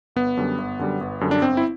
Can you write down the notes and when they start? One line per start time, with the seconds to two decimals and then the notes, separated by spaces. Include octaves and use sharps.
0.16 G1 B3
0.37 F#2 D3 G3
0.58 G1
0.79 F#2 D3 G3
1.01 G1
1.21 F#2 D3 G3
1.31 D4
1.42 G1 C4
1.57 E4